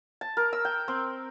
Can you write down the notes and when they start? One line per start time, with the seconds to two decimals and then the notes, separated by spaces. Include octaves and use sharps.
0.21 A5
0.37 A#4
0.53 E6
0.65 G5
0.88 C4